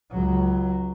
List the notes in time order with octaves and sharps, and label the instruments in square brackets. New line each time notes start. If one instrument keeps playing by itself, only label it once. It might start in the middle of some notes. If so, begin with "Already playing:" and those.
[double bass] C#2 F#3